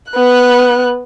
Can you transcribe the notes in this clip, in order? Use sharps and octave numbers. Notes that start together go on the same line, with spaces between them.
B3 F#6